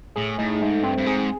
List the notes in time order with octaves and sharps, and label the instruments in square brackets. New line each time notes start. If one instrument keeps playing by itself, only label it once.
[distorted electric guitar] A2 [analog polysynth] G#4
[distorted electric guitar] A2 [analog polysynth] D#4
[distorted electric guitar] G#2 [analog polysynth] A3
[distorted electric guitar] G2 [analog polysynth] C4
[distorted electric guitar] G2
[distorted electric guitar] G#2 [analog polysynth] G#4